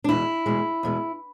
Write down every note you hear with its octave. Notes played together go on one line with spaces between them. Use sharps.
D4
E2 B2 G#3 E4
E2 B2 G#3
E2 B2 G#3